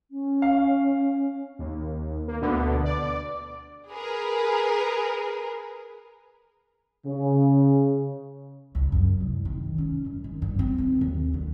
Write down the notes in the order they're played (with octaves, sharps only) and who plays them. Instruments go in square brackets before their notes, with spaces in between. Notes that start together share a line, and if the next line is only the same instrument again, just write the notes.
[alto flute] C#4
[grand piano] F5
[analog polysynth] D#2
A#3
D2 B2 D3 B3
D5
[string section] G#4 A#4 B4
[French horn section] C#3
[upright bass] C#2
F#2
C2
D#3
C#4
F#2
D#3
G2
C4
D#3
D#2
D3